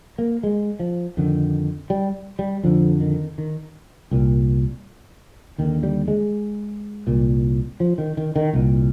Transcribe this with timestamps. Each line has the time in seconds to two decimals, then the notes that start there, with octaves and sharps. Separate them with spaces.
0.18 A#3
0.43 G#3
0.80 F3
1.17 F2 D3 D#3
1.90 G3
2.39 G3
2.64 F2 D3 F3
3.01 D#3
3.38 D#3
4.11 C2 A#2
5.58 D#2 D3 D#3
5.83 G3
6.08 G#3
7.07 C2 A#2
7.80 F3
7.98 D#3
8.17 D#3
8.36 D#3
8.53 C2 A#2